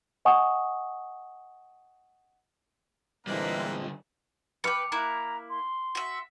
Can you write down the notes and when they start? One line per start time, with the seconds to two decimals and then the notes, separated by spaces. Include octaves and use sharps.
0.25 D#5 F#5 G#5 C#6 D#6
3.27 A#2 D3 E3 G3 G#3 A#3 C4 B4
4.64 B4 G5 D6 F6 C#7
4.92 A#3 E4 A#5 F#6
5.50 C6
5.95 F#4 E5